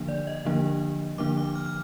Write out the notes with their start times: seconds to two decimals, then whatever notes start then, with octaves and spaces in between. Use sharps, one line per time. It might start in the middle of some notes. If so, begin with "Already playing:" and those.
Already playing: D3 F3 A#3 D4
0.09 D5
0.27 D#5
0.45 D3 F3 A#3 D4
1.18 D3 F3 A#3 D4 D6
1.38 D6
1.56 F6
1.66 F6